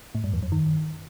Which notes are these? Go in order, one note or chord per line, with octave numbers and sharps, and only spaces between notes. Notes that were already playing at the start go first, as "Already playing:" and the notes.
A2
G2
E2
F#2
D#3